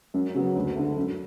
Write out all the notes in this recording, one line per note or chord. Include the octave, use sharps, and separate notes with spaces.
F#2
C#3 F#3 B3
D2
D3 A3
F#2